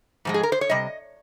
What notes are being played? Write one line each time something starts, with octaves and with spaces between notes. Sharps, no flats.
G#2 F3 G#3
G#4
A#4
C5
C#5
C3 G3 D#5